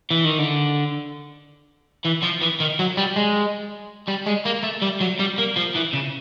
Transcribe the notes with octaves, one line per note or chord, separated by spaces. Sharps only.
E3
D#3
D3
E3
F3
E3
D#3
F#3
G3
G#3
G3
G#3
A#3
A3
G3
F#3
G3
A#3
F3
E3
C#3